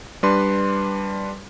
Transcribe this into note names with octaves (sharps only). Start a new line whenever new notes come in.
G3 D4 B4 C6